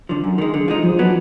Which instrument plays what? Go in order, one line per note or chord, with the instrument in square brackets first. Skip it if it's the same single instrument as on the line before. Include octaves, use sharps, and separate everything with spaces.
[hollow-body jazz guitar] D3 F3
F#2
D#3 G#3
D3
F3 G#3 D#4
[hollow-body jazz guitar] G#2 [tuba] F3
[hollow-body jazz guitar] F#3 B3 D4